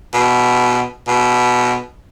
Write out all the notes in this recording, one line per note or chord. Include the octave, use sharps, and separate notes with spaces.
B2
B2